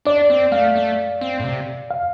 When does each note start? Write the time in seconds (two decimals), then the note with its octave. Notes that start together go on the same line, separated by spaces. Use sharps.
0.05 D4 D5
0.30 C4
0.52 A3 F5
0.76 A3
1.21 C4
1.40 A2
1.44 C3
1.90 F5